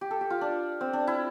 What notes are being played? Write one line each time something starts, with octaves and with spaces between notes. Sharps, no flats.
G4
A4
G4
F4
D4
C4
D4
E4